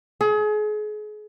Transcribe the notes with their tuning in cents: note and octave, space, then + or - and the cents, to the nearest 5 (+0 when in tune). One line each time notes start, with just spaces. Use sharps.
G#4 +35